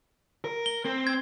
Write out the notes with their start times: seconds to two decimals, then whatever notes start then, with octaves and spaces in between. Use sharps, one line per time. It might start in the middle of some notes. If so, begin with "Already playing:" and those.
0.44 A#4
0.66 G7
0.85 C4
1.07 G#6